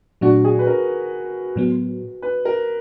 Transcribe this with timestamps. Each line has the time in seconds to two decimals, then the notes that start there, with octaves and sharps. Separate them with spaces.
0.21 A#2 F#3 A3 D4 F#4
0.44 G#4
0.59 B4
0.67 A#4
1.56 A2 F#3 B3
2.22 B4
2.45 A#4